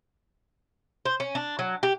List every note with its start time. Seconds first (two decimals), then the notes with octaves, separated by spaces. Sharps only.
1.05 C5
1.20 C#4
1.35 D4
1.59 F#3
1.83 G4